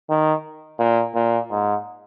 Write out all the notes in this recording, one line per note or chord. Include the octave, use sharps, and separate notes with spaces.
D#3
A#2
A#2
G#2